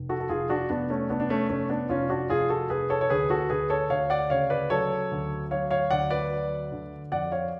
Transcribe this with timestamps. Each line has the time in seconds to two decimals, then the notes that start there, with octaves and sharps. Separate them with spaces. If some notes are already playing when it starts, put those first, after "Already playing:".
Already playing: F1
0.09 F#4 A4
0.20 A4
0.29 F1 F4 G#4
0.49 D4 F#4
0.70 F1 B3 D4
0.90 A3 C#4
1.09 F1 B3 D4
1.20 D4
1.30 A3 C#4
1.49 F1 A3 C#4
1.69 B3 D4
1.89 F1 C#4 F4
2.10 D4 F#4
2.30 F1 F4 G#4
2.50 F#4 A4
2.70 F1 G#4 B4
2.90 A4 C#5
3.01 C#5
3.10 D2 G#4 B4
3.30 F#4 A4
3.50 D2 G#4 B4
3.70 A4 C#5
3.90 D2 C#5 F5
4.10 D5 F#5
4.30 C#3 C#5 F5
4.50 B4 D5
4.70 F#3 A4 C#5
5.11 D2
5.51 F#3 C#5 F5
5.71 C#5 F5
5.91 D2 D5 F#5
6.11 B4 D5
6.31 F#3
6.72 D3
7.12 F2 D5 F#5
7.32 C#5 F5